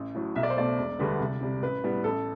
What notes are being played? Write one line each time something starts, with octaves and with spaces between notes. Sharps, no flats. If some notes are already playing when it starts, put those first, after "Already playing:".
Already playing: A1
A2 F#3
B1 E5
D5
C5
B2 A3 D5
E1
D2 D3 G3 B3
C2
C3 G3
A1 B4
A2 G3 B3
A1 A4